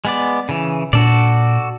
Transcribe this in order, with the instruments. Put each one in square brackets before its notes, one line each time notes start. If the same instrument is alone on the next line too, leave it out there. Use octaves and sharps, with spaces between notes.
[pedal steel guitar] G#3 B3 D5
C#3 E3
[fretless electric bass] A#2 D4 [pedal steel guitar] F#4 A4 D5